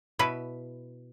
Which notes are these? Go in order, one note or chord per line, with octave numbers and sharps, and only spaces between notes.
B2 E4 B4